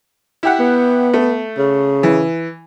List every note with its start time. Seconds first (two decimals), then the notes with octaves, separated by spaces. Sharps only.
0.43 E4 G4 F#5
0.59 B3
1.14 A3
1.57 C#3
2.03 E3